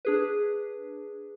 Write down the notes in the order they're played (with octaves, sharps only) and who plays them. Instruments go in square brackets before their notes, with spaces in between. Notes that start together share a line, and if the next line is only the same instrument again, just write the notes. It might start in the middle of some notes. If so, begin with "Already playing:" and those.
[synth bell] D4 G#4 B4